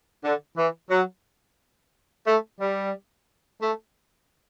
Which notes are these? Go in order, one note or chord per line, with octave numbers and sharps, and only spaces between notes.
D3
E3
F#3
A3
G3
A3